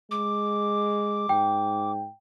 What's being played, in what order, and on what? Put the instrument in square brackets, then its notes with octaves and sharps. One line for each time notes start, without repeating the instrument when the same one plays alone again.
[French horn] G#3 [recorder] D6
[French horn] G#2 [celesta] G5